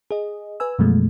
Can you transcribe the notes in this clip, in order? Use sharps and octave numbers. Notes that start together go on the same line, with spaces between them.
G#4 D#5
B4 G#5 E6
F#2 B2 F3 F#3 G#3 A3